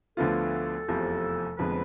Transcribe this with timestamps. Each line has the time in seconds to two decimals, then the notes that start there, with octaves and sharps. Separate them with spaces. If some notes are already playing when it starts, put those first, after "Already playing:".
0.17 D2 D3 F3 B3 F4 A4
0.88 F1 E2 C3 F3
1.58 F1 F2 D3 G#3 B3 B4